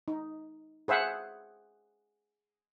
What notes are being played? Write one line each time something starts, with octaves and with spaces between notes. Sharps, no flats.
D#4
G#4 C5 E5 F#5